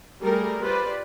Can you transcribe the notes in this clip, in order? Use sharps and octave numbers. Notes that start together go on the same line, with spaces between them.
G3 A3 G#4 A#4
F4 G4 B4 C5 D5